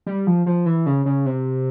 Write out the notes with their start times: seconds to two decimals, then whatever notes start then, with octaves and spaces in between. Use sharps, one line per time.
0.06 G3
0.27 F3
0.46 F3
0.66 E3
0.86 C#3
1.06 C#3
1.26 C3